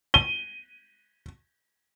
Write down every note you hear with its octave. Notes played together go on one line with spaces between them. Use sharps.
D#7 G7